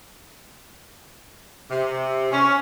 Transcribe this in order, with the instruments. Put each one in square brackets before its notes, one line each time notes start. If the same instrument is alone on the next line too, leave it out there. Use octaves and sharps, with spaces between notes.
[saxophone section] C3
C#4